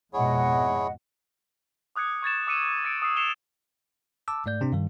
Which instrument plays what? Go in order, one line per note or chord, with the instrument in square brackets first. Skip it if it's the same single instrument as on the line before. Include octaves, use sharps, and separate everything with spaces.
[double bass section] F2 G#2 B2 [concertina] E4 G#4 C#5 [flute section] D#5 F#5
[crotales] D6 D#6 F#6 G#6 C#7
C#6 G#6 A6 E7
D6 E6 C#7 D#7 E7
E6 A6 C#7 D7
D#6 E6 C7 D#7
E6 C7 C#7 E7 F7 G7
[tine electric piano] A5 D6 E6
G#2 A3 D5 G6
C3 C4 D4
G2 D#3 G3